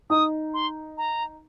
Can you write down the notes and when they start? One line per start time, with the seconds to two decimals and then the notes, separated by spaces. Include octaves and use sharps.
0.10 D#4 D#6
0.54 C6
0.98 A#5